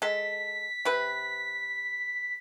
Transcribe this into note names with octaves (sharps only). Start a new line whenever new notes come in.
G#3 A4 B6
C3 B4